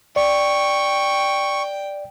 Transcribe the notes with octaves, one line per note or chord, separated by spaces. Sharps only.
D5 G5 C#6